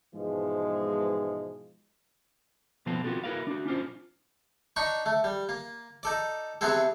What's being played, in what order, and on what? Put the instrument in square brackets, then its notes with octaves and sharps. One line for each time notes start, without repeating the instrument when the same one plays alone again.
[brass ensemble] G#2 B2 E3 F3 G#3
[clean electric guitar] B2 F3 B3 C4 F4 A4
B3 C4 F4 F#4 A4
E4 F#4 G#4 A#4 B4 F5
D4 F#4
C#4 D4 F4 C5
[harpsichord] D4 D#4 B5 C#6
A3
G3
A#3
D#4 A4 D5
C3 E3 B3 C4 G#4 A4